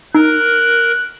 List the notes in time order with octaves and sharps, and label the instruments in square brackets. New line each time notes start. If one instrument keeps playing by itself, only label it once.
[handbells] D#4 [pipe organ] A#4 [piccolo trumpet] F#6